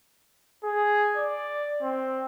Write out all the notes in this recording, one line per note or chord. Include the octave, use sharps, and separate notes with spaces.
G#4
D5
C4